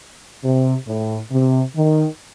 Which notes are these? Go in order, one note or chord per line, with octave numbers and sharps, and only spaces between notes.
C3
A2
C3
D#3